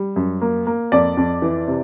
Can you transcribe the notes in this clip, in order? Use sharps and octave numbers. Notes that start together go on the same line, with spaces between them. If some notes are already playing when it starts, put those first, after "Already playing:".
Already playing: G3
F#2
A#3
A#3
F2 D5
F2
E3
C3